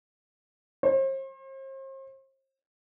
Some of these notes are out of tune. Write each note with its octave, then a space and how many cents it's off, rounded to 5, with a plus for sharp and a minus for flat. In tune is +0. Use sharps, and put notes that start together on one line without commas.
C5 +40